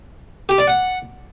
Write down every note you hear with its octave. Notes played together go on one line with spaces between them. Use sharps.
G4
D5
F#5